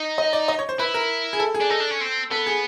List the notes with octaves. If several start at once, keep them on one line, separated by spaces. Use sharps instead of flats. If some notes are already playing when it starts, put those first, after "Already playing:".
Already playing: D#4
D#5
D5
D#5
C#5
C5
E4 B4
A#4
G#4
A4
G#4
D4
D#4 A4
D4
C#4
C4
B3 A4
G#4